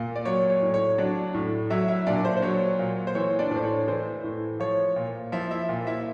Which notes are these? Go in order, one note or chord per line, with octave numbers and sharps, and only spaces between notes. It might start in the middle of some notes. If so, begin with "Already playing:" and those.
Already playing: A#2
D5
F#3 C#5
C#5
A2
C#5
F#3 D4 D5
A2
F#3 E4 E5
E4 E5
A#2 D4 D5
C5
C5
F#3 C#5
A#2
C5
E3 C#5
D4 D5
A2
C5
C#5
E3 C5
A2
F3 C#5
A#2
F3 E4 E5
E4 E5
A#2
E4 E5